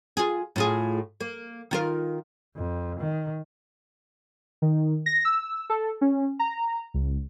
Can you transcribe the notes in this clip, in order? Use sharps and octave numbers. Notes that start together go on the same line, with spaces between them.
F4 G#4
A2 F4 G#4
A#3
D#3 F4 A#4
F2
D#3
D#3
A#6
E6
A4
C#4
A#5
C#2